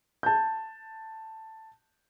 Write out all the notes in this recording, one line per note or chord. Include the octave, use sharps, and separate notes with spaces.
A5 G6